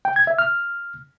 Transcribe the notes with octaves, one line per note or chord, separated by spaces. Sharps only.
G5
G#6
E5
F6